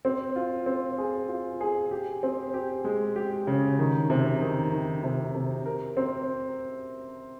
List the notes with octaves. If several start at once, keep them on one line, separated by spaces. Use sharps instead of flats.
C4
F4
C4
G#4
F4
G#4
G4
C4
G4
G#3
G4
C#3
D#3
C3
D#3
D#3
C3
C3
A#4
C4